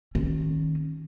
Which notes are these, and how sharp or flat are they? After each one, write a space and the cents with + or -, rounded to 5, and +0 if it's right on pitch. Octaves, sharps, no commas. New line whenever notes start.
D#3 +0 C#4 -30